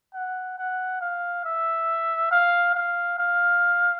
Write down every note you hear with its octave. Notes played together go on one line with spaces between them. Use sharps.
F#5
F#5
F5
E5
F5
F5
F5